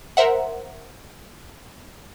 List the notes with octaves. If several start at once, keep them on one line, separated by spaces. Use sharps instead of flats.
A#4 C5 E5 F#5